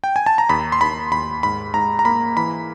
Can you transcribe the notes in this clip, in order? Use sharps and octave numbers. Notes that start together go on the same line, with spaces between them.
G5
G#5
A5
A#5
D#2 B5
C6
D#2 B5
D#2 B5
G#2 B5
G#2 A#5
A#5
A#3 B5
E3 B5